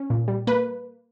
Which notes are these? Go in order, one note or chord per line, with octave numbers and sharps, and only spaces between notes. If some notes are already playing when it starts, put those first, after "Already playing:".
Already playing: C#4
A#2
G3
A#3 B4